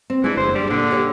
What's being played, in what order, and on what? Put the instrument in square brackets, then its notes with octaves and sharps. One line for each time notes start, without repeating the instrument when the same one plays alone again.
[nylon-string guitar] C4
[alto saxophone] E3 [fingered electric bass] G#3 [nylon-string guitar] D4 G#4
[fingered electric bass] F#1 [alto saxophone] C5
[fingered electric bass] G2 [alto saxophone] G3
[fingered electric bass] A#2 [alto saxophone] D3 [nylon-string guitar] D4
[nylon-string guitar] G4 C#5